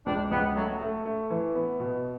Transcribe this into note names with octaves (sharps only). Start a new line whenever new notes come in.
C#2 D4
C#2 B3
F#3 A3
A3
A3
E3
B3
B2